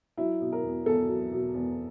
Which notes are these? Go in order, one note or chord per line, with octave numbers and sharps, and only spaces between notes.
F#3 E4
B2
A#4
E2
E2 A4
F#3
B2
E2